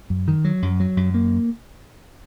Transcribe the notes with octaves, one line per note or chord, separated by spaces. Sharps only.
F#2
D#3
F#3
F#2
F#3
F#2
A#3